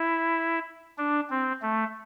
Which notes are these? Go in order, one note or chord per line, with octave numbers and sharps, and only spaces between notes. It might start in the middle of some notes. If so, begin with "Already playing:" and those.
Already playing: E4
D4
C4
A3